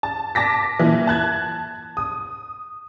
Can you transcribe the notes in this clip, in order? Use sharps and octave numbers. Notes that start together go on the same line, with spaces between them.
A5
A5 D6 A#6 B6
A#2 E3
A5 F#6 G#6
D#6